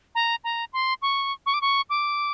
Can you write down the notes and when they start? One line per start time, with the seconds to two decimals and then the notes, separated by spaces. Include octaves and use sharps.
0.15 A#5
0.44 A#5
0.73 C6
1.02 C#6
1.46 C#6
1.54 D6
1.62 C#6
1.90 D6